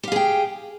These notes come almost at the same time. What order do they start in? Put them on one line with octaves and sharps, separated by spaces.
G4 F5 G#4 G5